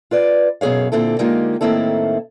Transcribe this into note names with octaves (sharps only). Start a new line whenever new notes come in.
F4 B4 D5
F#2 B2 G#4 C#5 F5
A#2 D3 C4 E4 A4
D3 G#3 A#3 D#4 F4 G4
A2 D#3 A#3 C4 E4 A4